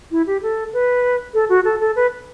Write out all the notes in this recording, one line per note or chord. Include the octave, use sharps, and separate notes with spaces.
E4
G4
A4
B4
A4
F#4
A4
A4
B4